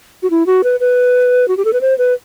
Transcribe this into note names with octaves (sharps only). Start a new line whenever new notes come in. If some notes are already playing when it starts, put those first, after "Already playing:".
F#4
E4
F#4
B4
B4
F#4
G4
A4
B4
C5
B4